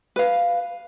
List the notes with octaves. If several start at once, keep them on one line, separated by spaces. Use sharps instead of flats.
B4 F5